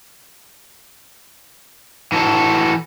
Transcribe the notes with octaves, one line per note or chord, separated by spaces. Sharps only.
E3 F#4 A4